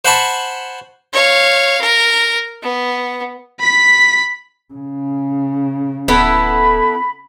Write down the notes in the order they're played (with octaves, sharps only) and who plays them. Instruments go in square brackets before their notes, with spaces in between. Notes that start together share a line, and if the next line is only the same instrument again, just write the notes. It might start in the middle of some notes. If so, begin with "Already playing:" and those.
[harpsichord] C5 F#5 G#5 A5 B5 C#6
[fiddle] C#5 F5
A#4
B3
[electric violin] B5 B6
[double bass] C#3
[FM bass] D1 [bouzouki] B3 E4 A4 [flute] B5